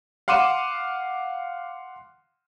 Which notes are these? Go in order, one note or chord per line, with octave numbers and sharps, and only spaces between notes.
F5 F#5 C6 D6 D#7 E7